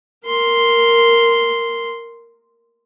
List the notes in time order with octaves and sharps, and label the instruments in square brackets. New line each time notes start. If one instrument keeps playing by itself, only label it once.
[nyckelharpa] A#4 C6